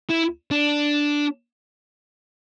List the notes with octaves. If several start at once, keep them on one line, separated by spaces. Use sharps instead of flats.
E4
D4